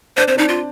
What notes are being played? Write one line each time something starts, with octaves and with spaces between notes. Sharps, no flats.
D4 C5
C4 C5
D4 D#4
F4